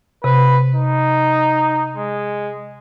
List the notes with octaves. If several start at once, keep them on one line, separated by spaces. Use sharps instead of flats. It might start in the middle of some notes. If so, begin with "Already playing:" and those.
C3 B4
D#4
G#3